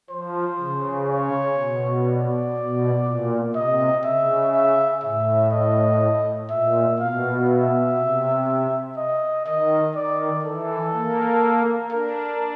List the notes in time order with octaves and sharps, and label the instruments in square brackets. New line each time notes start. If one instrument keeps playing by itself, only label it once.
[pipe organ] F3 [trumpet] C5
[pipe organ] C#3
[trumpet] C#5
[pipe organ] B2
[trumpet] D5
[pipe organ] B2
A#2
[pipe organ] C3 [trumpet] D#5
[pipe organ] C#3 [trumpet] E5
[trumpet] E5
[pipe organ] A2 [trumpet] E5
[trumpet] D#5
[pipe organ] A#2 [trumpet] E5
[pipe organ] B2 [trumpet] F5
[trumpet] E5
[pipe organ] C3
[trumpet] D#5
[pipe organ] D#3 [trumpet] D#5
[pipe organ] D#3 [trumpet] D5
[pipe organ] E3 [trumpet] A4
[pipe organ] A#3
[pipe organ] D4 [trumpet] A#4